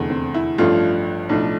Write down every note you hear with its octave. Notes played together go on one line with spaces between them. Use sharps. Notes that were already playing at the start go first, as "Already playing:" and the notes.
Already playing: F1 E2 D3
C4
E4
A1 G2 F3 A3 F4
B1 A2 F3 D4